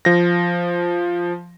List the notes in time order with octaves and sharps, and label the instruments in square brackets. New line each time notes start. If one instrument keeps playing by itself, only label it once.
[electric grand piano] F3 A#6